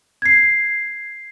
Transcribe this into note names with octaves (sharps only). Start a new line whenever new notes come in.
G#6 C7